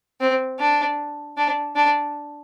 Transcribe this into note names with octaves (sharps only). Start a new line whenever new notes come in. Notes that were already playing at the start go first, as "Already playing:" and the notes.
C4
D4
D4
D4